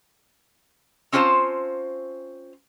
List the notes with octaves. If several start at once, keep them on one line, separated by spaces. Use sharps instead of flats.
C4 C#4 F4 B4 C5 A5